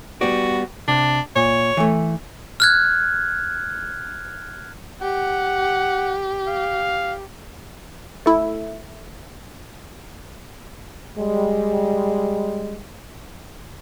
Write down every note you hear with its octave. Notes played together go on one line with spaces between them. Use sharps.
G3 B3 F#4 D5
C3 D4
A#2 C#5
E3 A3
F6 F#6 G#6
G4 F#5
F5
A3 E4
G3 G#3